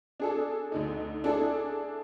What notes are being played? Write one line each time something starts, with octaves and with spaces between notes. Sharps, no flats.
D4 G#4 A4
D2 D3 D#4
D4 E4 G#4 A4 D5